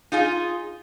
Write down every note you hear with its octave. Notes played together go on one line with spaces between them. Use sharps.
D#4 F4 G#4